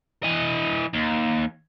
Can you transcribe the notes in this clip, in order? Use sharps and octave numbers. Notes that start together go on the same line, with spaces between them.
E3 D#5
D#2